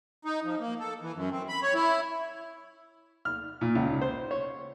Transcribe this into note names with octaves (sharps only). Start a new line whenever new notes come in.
D#4
F3
A#3
A4
E3
F#2
C4
B5
C#5
E4
F6
A#2
C#2
C5
C#5